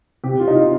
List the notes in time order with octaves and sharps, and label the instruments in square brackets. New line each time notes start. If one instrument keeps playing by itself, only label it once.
[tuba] C3 [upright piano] G4
[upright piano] F4
D#4
F4